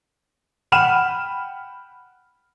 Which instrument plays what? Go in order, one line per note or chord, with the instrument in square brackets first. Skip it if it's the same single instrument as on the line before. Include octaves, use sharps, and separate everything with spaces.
[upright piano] F#5 G5 B5 F6 D#7 E7